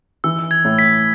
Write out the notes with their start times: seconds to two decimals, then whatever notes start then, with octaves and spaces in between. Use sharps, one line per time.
0.24 E3 E6
0.51 G#6
0.65 A2
0.79 B6